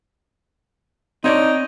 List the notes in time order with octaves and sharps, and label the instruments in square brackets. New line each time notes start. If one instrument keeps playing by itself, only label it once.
[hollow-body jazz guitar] C4 C#5 D5 [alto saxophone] D#4